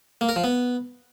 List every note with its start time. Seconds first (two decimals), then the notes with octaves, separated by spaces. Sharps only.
0.21 A#3
0.29 A#4
0.36 F3
0.44 B3